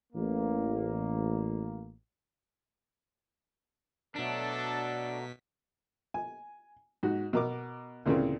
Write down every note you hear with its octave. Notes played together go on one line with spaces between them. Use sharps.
A1 A#3
B2 F#3 A3 D4 A4 A#5 B6
G#5
G#2 F#4
B2 A#4 D6
D2 A#2 C#3 E3 A#3 C4